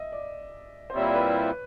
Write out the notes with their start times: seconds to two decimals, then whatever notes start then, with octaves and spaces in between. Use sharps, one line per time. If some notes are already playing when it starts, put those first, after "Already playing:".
Already playing: D#5 E5
0.12 D5
0.90 C5
0.94 A#2 G3 C4 E4 C#5
1.14 B4